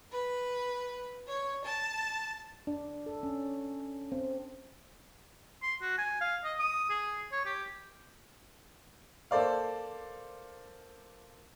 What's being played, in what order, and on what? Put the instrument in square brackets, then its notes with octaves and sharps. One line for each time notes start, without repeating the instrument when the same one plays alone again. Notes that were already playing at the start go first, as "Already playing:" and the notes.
[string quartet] B4
C#5
A5
[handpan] D4
A4
C#4
C4
[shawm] C6
F#4
G#5
F5
D#5
D#6
G#4
C#5
G4
[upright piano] A#3 A4 C5 D5 F5